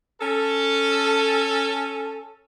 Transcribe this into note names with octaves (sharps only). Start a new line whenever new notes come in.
C#4 A4